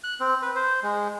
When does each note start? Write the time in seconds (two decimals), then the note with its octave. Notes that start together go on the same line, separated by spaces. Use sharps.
0.04 F#6
0.20 C4
0.42 B4
0.56 C5
0.83 G#3